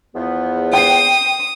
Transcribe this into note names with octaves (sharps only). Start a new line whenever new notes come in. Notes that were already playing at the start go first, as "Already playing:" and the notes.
E2 F3 B3
G5 D#6 C7